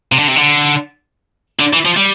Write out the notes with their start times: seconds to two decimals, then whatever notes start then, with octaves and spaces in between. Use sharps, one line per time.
0.12 C3
0.19 D3
0.28 C3
0.36 D3
1.60 D3
1.73 E3
1.86 F3
1.97 G3